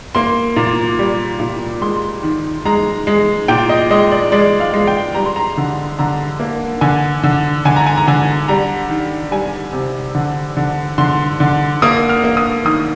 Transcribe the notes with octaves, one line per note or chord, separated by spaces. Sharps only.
A#3 C6
A#2
G3
A#2
G#3 C6
D#3
G#3 A#5
G#3
A#2 G5
D#5
G#3 D#5
D5
G#3 D5
F5
G#3
G5
G3 A#5
C6
A#5
D3
D3 A#5
A#3
D3 G#5
D3
D3 G#5
A#5
G#5
A#5
D3 G#5
G3 A#5
D#3
G3 G#5
C3
D3
D3
D3 C6
D3
A#3 D#6
F6
A#3
D#6
D#3 D#6